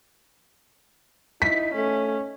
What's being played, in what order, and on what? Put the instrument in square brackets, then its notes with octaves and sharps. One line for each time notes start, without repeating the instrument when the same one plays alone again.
[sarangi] D#4 [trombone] E4 [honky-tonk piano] B6
[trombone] A3 [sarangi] C#4